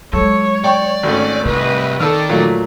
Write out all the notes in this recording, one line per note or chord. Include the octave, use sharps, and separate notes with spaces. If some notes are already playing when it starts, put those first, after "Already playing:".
F#3 G#3 A4 C#5
D5 G5 C#6
G#1 A3 C#4
C2 C4 B4 D#5
D#3 A4 D5 E6 F6
A#2 F#3 A3